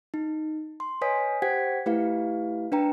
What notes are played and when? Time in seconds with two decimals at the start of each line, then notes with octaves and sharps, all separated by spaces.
0.14 D#4
0.80 C6
1.01 B4 C#5 D#5 G#5 D#6 B6
1.42 G4 C5 F#5 G5 G#6 B6
1.86 A3 E4 G4 B4 F5
2.72 D4 B4 G5 A#5